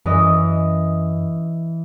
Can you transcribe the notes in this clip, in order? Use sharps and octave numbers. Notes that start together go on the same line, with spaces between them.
F#2 E3 D#5